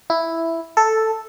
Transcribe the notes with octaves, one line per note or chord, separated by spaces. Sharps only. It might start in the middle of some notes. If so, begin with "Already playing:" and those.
E4
A4